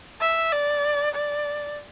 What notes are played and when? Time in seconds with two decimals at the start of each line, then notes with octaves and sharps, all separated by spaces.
0.21 E5
0.52 D5
1.15 D5